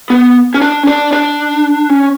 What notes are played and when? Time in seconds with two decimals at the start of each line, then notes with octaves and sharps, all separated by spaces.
0.10 B3
0.54 C#4
0.61 D4
0.83 C#4
0.87 D4
1.13 D4
1.90 C#4